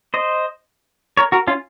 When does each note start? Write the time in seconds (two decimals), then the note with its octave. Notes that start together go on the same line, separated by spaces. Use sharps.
0.14 C5 D#5
1.17 A#4 C#5
1.32 F#4 A#4
1.47 C#4 F4